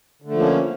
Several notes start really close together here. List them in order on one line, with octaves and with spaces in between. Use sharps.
D3 A3 F3 A#3 C#4